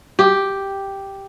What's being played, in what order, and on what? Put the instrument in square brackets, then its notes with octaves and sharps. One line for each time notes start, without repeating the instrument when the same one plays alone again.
[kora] G4